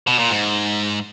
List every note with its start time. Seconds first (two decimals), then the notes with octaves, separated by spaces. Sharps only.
0.07 B2
0.19 A#2
0.31 G#2